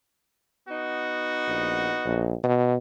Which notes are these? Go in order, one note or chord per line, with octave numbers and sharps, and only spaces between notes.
B3 D#4 F#4
A#1
A#1
B2